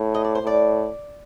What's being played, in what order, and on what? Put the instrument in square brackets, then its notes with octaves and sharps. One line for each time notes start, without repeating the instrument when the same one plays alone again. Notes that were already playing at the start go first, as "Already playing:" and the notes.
Already playing: [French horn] A2
[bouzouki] D#5
D5
C5
[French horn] A2
[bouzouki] D5